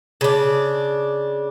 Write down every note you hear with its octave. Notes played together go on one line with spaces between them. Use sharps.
C#3 D4